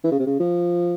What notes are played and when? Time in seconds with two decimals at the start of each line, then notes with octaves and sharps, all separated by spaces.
0.04 E3
0.11 C#3
0.19 C3
0.26 C#3
0.40 F3